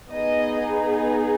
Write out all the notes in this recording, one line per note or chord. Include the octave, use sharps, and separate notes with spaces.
B3 D#4 G#4 D#5